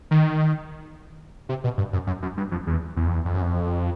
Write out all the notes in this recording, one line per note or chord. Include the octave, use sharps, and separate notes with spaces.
D#3
C3
B2
G2
F#2
F#2
F#2
G2
F2
E2
E2
F2
E2
F2
F#2
F2